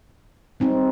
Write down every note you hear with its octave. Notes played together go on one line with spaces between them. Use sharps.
G3 C4 D#4